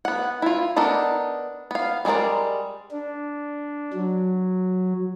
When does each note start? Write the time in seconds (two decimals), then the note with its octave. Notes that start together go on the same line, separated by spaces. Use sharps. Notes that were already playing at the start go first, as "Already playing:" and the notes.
0.05 B3 F#5
0.42 E4 F4
0.76 B3 D4 D#4 A4 A#4
1.71 B3 F5
2.05 G3 G#3 C#4 A#4 D5
2.92 D4
3.93 F#3